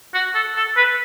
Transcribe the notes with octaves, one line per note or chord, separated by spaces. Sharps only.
F#4
A4
A4
B4